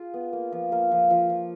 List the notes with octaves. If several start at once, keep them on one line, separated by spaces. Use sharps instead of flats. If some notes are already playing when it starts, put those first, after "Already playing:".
Already playing: F4 G#4
B3
A#3
F3
A#3
F3
F3
F3